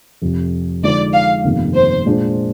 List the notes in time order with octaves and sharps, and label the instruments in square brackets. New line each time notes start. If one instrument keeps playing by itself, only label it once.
[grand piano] F1 F2 C3
[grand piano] D3 F3 G#3 D#4 [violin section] D5
[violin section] F5
[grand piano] G1 F2 C3 D#3 A#3
[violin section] C5
[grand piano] A#2 G#3 D4 G#4 C5